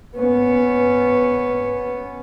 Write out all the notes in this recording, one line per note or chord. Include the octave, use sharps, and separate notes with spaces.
B3 C#4